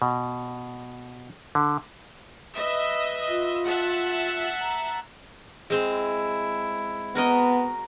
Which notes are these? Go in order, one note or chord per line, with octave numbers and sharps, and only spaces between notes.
B2
D3
B4 D#5 E5
F4
E5 F#5 A5
A#5
G#3 C4 E4
B3 F#4 A#4 D#5